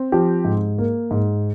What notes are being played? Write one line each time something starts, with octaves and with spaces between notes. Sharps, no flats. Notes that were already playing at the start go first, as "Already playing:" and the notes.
Already playing: C4
F3 G4
G#2
A#3
G#2